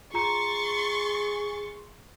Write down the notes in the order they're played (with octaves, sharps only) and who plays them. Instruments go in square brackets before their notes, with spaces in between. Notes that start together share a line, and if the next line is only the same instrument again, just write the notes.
[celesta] F4 A#5 C#7 [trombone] G#4 [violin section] C6 C#6 A6